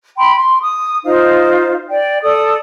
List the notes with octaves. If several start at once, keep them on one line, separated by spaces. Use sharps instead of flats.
G5 B5 C6
C6
D#6
D#4 F4 C5 F5
D5 G5
A4 D5 D#6